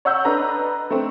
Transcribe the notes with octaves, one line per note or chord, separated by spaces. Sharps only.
C#5 F#5 E6 G6
D4 A4 B4 D#5 A#5
A3 C4 D4